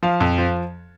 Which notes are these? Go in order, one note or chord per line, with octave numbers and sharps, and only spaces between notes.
F3 F5
F2
F3